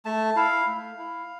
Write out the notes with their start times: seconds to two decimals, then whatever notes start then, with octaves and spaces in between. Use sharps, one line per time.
0.05 A3 A5
0.36 E4 F5
0.67 A3
0.98 E4